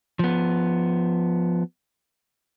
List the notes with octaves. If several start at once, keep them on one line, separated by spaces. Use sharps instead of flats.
F3 B3